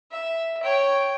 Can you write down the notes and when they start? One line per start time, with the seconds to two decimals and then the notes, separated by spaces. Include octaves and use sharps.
0.12 E5
0.63 C#5 G5